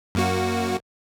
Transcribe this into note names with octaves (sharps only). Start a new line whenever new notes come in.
F#2 A#3 F#4